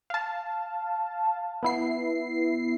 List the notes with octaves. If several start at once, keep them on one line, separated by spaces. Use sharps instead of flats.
F5 A5
B3 E4 C7